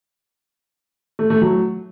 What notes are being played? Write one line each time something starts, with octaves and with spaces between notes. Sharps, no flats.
A3
A3
F#3